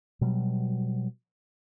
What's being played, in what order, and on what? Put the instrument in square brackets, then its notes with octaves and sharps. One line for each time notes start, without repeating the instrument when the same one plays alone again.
[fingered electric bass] B2 F#3 G3